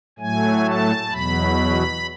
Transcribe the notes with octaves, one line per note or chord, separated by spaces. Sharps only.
A2 F#3 A3 G#5
A5
E2 B2 F#3 B5